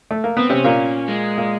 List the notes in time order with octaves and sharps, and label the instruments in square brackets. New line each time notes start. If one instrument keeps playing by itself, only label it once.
[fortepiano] A3
A#3
[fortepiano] B3 [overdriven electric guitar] C4
[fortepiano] C3 C4 [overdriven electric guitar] C#4
[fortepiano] A#2 A#3
[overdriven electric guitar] G#3
[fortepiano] A#2 A#3